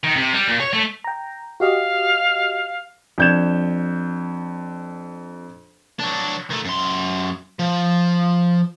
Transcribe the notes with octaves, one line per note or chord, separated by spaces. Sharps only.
D#3
C3
G3
A#2
C#5
A3
G5 A#5
F#4 G4 D#5 F5
F2 D4 G6 G#6 E7
F#3 D4
D#3 A3
F#2 C6
F3